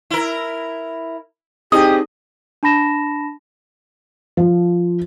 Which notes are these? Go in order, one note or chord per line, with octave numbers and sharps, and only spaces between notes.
E4 A#4
C4 D#4 E4 G4 G#4 D#5 D#6
D4 A5 B5 A#6 E7
F3